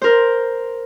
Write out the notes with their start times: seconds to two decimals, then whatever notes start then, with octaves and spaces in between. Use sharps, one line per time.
0.02 A#4 C5